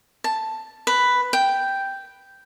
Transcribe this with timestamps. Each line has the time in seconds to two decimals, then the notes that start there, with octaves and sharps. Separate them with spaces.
0.24 A5
0.87 B4
1.33 G5